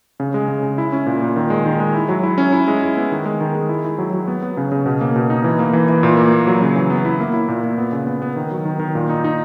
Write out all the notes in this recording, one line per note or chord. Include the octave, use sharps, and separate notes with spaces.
C#3
G#3
C#3
C#3
E4
C#4
A#2
A#2
D#3
G#3
D#3
G#3
E4
F#3
E4
C#4
E4
G#3
E4
B3
D#3
G#3
D#3
G#3
E4
E4
F#3
F#3
B3
B3
C#3
C#3
B2
A#3
B2
D#4
E3
A#3
E3
E3
A#2
A#3
A#3
F#3
C#3
E3
B3
E4
A#3
E4
A#2
A#2
B3
C#3
B3
B3
D#3
F#3
D#3
D#3
A#2
D#4
D#4